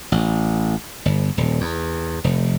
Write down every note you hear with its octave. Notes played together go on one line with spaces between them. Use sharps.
A1
G1
D#1
E2
F1